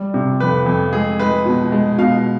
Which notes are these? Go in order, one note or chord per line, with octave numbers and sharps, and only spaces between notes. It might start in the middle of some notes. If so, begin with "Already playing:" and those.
Already playing: G3
C3
F2 B4
F2
G#3 G#4
G#3 B4
B2
G#3
B2 F5